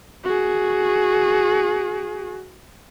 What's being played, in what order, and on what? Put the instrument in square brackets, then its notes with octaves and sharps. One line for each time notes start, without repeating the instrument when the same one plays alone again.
[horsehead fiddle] F#4 G#4